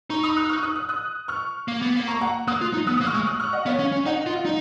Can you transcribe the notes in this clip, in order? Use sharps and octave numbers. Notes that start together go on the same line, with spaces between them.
D#4 A#5 C#6
B5 D#6
D#6 F#6
C#6 F6
D#6 F#6
D#6 F#6
D#6 F#6
C#6 F6
A#3
B3
A#3
A#5 C#6
F#5 A#5
A#3 D#6 F#6
F4
D#4
B3 D#6 F#6
A#3 D#6
C#6 F6
G#3
F6
D#6 F#6
C#6 F6
D#5 F#5
B3 C#5 F5
C#4
C#4
D#4 D#5 F#5
F4
F5
D#4 D#5